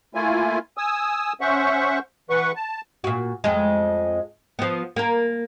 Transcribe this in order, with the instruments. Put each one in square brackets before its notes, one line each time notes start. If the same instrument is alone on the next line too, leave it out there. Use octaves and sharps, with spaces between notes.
[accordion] A3 A#3 E4 F4 G#5
G#5 D#6 E6
C#4 C5 E5 F#5 C#6
E3 B4 F#5 C#6
A5
[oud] A#2 F#4
F2 G#3
F3 B3
A#3 A#4